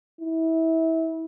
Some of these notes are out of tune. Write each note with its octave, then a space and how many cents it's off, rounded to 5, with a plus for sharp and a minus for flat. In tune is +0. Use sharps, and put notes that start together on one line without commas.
E4 -25